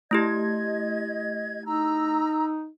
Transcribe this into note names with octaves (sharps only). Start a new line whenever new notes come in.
A3 E4 G4 D#5 G#6
D#4 A#5 E6